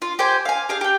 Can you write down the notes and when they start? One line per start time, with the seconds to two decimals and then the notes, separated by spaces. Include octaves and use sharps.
0.02 F4
0.19 G4 C5 G5 G#5
0.45 F5 G#5
0.69 G4 G#4 F5
0.81 G4 G5